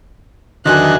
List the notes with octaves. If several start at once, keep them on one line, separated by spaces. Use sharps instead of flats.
E2 D3 D#3 F#3 F4 G#5 F#6